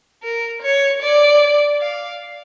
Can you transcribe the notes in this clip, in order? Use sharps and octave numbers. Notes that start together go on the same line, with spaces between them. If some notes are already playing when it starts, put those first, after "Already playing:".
A#4
C#5
D5
F5